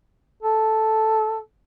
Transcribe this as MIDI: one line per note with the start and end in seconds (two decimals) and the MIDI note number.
0.43 1.38 69